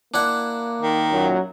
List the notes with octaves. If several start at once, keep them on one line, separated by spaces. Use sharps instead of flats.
A#3 D4 E4 F#5
D#3
F#2 A#2 F#3